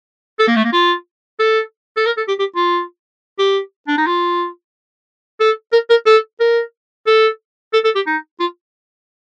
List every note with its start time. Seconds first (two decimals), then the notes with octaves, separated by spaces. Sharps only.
0.39 A4
0.48 A#3
0.56 A3
0.64 A#3
0.73 F4
1.39 A4
1.97 A4
2.06 A#4
2.18 A4
2.28 G4
2.39 G4
2.56 F4
3.39 G4
3.88 D4
3.98 D#4
4.07 F4
5.40 A4
5.73 A#4
5.90 A#4
6.06 A4
6.40 A#4
7.07 A4
7.73 A4
7.85 A4
7.95 G4
8.07 D#4
8.40 F4